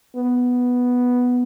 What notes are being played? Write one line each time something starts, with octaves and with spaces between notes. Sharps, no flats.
B3